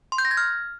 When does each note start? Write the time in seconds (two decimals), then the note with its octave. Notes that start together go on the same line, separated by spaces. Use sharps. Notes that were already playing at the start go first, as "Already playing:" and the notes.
0.12 C6
0.18 G6
0.25 A#6
0.31 G#6
0.37 F6